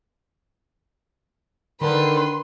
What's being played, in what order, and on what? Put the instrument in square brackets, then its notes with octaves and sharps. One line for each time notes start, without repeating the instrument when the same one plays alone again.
[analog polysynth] D3 [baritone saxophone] D#3 [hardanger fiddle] B4 [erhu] C6